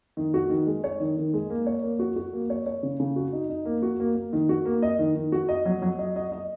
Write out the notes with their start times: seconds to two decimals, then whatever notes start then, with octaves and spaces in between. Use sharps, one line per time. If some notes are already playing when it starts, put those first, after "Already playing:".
0.17 D#3
0.34 F#4
0.50 D#3
0.67 G#3
0.84 C#5
1.00 D#3
1.17 D#3
1.34 G#3
1.50 A#3
1.66 C#5
1.83 A#3
1.99 F#4
2.16 F#4
2.33 A#3
2.50 C#5
2.66 C#5
2.83 C#3
3.00 C#3
3.16 F#4
3.33 D#4
3.49 D#4
3.65 A#3
3.82 F#4
4.00 A#3
4.15 A#3
4.33 D#3
4.49 F#4
4.66 A#3
4.82 D#5
4.99 D#3
5.15 D#3
5.32 F#4
5.49 D#5
5.65 F#3
5.82 F#3
5.99 D#5
6.16 D#5
6.32 D#5